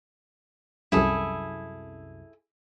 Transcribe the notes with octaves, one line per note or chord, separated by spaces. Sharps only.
C2 F#2 E4 G#4 A4